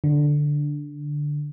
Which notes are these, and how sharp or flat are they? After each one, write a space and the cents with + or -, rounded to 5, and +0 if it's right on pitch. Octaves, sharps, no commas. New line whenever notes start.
D3 +0